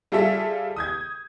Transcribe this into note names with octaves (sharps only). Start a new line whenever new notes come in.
G3 F4 G#4 A4 E5
D#6 G6 G#6